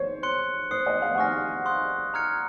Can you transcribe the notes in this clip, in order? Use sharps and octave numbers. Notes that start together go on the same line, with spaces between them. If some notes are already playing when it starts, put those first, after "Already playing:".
Already playing: C5 C#5
C6 F#6 C#7
C5 D#6 F#6 C7
D#5
F5
F#5
G#5 C#6 F6 A#6
C6 D#6 F#6
A#5 F6 G#6 C#7